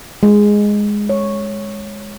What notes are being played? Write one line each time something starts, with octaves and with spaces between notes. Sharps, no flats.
G#3
C#5